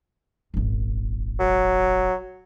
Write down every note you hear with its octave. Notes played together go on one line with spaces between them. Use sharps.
D#1 G#1
F#3